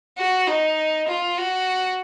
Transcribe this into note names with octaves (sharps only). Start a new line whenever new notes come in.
F#4
D#4
F4
F#4